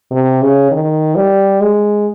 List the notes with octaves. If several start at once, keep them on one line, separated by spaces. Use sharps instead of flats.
C3
C#3
D#3
G3
G#3